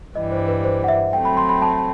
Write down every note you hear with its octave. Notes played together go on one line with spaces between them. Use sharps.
G2 E3 G3 D#5
C5
B4
C5
F#5
E5
F#3 A3 C4 G5
B5
C6
B5
A5